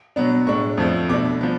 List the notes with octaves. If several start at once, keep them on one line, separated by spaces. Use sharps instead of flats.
B2 F#3 B3 D4
A2 G#3 D4 C#6
F2 F3 A3
B2 A3 D4 D6
F3 B3